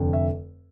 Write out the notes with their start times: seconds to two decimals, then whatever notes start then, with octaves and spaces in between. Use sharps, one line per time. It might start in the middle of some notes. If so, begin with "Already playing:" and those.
Already playing: F1 F2 D3
0.13 E5